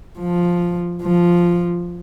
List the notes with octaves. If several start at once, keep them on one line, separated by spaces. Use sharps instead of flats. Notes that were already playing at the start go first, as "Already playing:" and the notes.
F3
F3